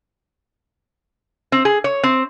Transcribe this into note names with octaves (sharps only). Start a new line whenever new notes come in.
C4
G#4
C#5
C4